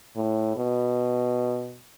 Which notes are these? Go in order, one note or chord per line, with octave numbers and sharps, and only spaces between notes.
A2
B2